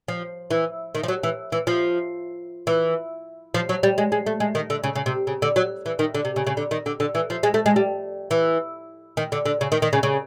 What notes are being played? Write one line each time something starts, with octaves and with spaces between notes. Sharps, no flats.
F3
E3
D#3
F3
F#3
E3
E3
F3
E3
F3
F#3
G3
G#3
G#3
A3
G#3
D#3
D3
C#3
C#3
C3
C#3
D3
F#3
E3
D#3
D3
C3
C#3
C#3
D3
D#3
D3
D3
E3
F3
G#3
A3
G#3
G3
E3
D#3
D3
D3
C#3
D#3
D#3
C#3
C#3